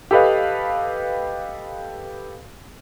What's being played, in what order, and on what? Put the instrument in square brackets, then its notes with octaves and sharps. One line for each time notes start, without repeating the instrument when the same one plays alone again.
[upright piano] G4 A4 B4 D#5 F5